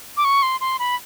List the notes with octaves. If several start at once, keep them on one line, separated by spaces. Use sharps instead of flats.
D6
C#6
C6
C6
B5